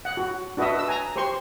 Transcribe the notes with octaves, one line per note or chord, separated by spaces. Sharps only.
F#5
F#4
D4 F#4 B4 D#5 E5
B4 E6
G#5 A#5
G4 C5 C6 C#6